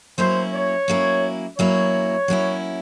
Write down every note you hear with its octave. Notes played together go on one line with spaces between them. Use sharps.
F#3 A#3 C#4 E4 C5
C#5
F#3 A#3 C#4 E4
F#3 A#3 C#4 E4 C#5
F#3 A#3 C#4 E4